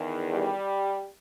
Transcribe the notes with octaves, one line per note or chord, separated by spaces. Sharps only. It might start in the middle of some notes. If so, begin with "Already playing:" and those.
Already playing: E2 D#3
G3